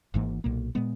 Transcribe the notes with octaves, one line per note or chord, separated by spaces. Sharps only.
G#1 G#2 E3 A#3
B1 A#2 A#3
A#2 G#3 B3